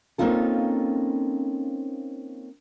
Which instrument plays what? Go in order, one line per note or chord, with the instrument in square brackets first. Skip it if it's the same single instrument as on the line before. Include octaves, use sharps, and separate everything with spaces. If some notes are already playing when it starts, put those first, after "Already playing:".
[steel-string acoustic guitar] A#3 C4 C#4 D#4 F4 A4